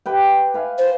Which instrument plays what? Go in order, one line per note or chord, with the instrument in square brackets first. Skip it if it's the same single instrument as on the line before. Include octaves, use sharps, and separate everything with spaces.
[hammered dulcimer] G4 B4 G5
B4 F5 G#5
[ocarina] C5